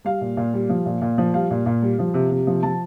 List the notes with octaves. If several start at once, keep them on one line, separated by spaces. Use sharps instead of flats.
G3 F5
A#2
A#2
G3
F3
A#2
A#2
F3
G3 F5
A#2
A#2
G3
F3
C3
C3
F3
F3 A5